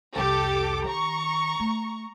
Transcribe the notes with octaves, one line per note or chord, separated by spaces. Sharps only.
C2 F2 G4 A4 D6
D#3 A#5 C#6
A3